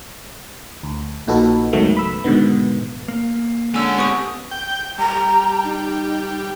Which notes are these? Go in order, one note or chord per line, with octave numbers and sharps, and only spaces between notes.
D2
A#1 A#2 D#4 F#4 A4 B4
C#2 G#2 D#3 F#3 A3 B3
B5 E6
G#2 B2 D3 D#3 B3
A#3
D3 G#3 C#4 G#5 E6
B3 G4 B4 C#6 D#6 G6
G5
G3 A#5
D#4